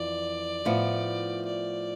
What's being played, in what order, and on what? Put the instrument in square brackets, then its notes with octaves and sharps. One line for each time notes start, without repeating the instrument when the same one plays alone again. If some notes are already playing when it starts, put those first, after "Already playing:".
Already playing: [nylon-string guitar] F2 E3 [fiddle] D5
[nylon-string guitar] A2 F3 B3 E4
[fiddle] D5